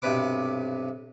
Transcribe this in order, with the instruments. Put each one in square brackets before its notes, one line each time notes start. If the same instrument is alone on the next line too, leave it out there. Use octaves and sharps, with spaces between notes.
[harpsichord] B1 G2 C3 B4 D6